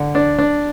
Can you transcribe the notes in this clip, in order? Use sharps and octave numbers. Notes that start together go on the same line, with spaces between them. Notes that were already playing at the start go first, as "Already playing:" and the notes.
Already playing: D3
D4
D4